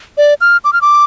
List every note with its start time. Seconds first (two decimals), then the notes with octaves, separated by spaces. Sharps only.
0.18 D5
0.41 F6
0.64 D6
0.73 F6
0.82 D6